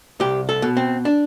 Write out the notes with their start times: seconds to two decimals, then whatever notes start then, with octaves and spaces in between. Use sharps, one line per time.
0.20 C2 G4
0.49 A4
0.62 B2
0.77 C4
1.05 D4